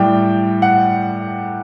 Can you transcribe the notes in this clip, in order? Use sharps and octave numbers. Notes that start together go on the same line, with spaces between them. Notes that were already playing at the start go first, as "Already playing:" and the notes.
Already playing: A2 G3 G5
F#5